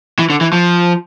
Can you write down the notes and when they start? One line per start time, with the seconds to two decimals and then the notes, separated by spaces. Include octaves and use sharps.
0.19 E3
0.30 D3
0.41 E3
0.52 F3